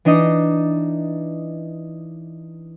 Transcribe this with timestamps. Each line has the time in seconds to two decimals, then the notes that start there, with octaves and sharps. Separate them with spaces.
0.05 E3 D4 D#4 D#5